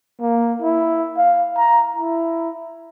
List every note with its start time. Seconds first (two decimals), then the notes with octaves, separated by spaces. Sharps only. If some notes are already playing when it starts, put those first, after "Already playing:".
0.21 A#3
0.62 E4
1.17 F5
1.58 A#5
1.97 E4